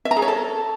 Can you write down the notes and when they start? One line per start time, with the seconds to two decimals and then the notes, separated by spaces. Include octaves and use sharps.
0.05 E5
0.11 A#5
0.17 G#4
0.22 C#5
0.28 A4